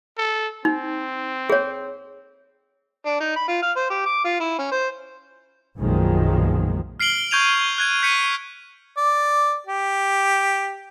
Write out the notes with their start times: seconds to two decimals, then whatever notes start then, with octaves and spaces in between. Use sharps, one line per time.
0.18 A4
0.65 C4 D#4
1.50 G#4 C#5
3.06 D4
3.20 D#4
3.36 B5
3.48 F4
3.62 F5
3.76 C5
3.90 G4
4.06 D6
4.24 F4
4.40 E4
4.58 C#4
4.72 C5
5.78 B1 F#2 A#2 D#3 F3 G#3
7.00 F6 C7 D7 F#7 G7
7.31 C#6 G6 G#6 D#7 F7
7.78 F#6 G#6 D#7
8.02 G6 B6 C#7 D#7
8.97 D5
9.67 G4